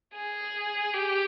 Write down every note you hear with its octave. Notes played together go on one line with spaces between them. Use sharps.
G#4
G4